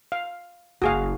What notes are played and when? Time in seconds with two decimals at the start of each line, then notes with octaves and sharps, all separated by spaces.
0.12 F5
0.82 F#1 F#4 G#4 F5